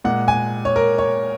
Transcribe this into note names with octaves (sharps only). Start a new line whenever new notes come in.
A#2 G#3 F#5
G#5
C#5
A#4
C#5